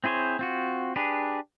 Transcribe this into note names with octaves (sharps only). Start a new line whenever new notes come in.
C4 E4 G#4 C5 C#5
C4 F4 F#4
D4 G4 G#4 B4